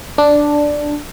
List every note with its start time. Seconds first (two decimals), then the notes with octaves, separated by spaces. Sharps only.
0.18 D4